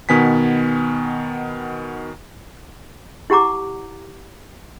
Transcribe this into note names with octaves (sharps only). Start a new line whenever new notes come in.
B2 D#3 B3 G#5 B6
E4 G4 F#5 A#5 D6